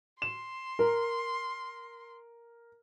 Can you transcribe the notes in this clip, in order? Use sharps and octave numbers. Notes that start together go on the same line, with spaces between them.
C6 E7
A#4